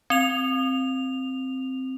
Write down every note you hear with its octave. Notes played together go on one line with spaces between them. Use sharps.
C4 F7